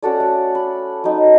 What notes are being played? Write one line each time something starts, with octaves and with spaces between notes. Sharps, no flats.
C#4 F#4 A4 D5
A3
B5
F#3 D#4